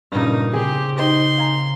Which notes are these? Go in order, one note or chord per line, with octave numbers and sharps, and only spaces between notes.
G2 A#2 C#3 D#4 F6
C#3 C4 G4 G#4
D#4 C5 C6
F5 G#5 A#5